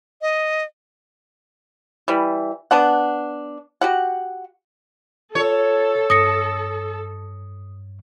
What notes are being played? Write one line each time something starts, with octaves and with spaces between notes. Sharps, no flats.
D#5
E3 G3
B3 D4 F#5
F#4 G4 F#5
F4 A4 C#5
G2 D#6 A#6 C#7